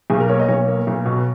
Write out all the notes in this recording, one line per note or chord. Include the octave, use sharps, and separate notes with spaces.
B1 G#4
A#4
A#3 C#5
D#5
B1 C#5
A#3
B1
B2